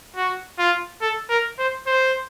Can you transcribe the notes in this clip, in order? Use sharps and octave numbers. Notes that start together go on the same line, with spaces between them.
F#4
F4
A4
A#4
C5
C5